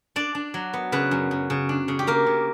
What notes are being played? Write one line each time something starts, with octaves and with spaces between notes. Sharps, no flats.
D4 D5
D4
F#3
B3
C#3 B4
F#2
F#2
C#3
D4
C#3
G4
A#3 A#4
C#3